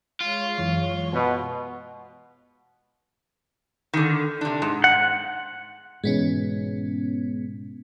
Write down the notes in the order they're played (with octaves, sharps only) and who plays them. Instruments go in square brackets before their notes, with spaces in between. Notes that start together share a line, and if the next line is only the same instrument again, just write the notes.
[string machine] G#3 C#5 C#6 [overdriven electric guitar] F4
[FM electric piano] F#2 E3
[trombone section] B2
[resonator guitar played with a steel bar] D3 D#3
C3 D4
G#2
[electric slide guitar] F#5
[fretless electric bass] G#2 B2 E3 [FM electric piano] G#3 B3 C#4